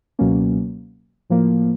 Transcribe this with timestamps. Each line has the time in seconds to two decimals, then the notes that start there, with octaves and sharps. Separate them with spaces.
0.19 C#2 B2 F#3 A#3 C#4
1.30 A2 F3 A#3